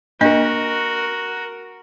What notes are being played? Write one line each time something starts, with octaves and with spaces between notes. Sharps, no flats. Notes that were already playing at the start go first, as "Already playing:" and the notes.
A#3 D4 F#4 A#4 D#5